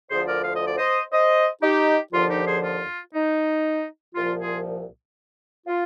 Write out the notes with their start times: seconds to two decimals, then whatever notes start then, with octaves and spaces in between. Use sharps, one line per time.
0.10 D2 D3 F3 G#4 C5
0.27 A#4 D5
0.44 F5
0.56 D#5
0.67 D5
0.78 C5 D#5
1.12 C5 D#5
1.62 D#4 G4
2.13 D#2 D3 F3 F4
2.30 D#4 G4
2.47 G#4 C5
2.64 F4
3.15 D#4
4.15 C2 A#2 F3 F4
4.40 F4 G#4
5.67 F4